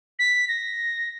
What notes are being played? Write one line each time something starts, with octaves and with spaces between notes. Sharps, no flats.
B6
A#6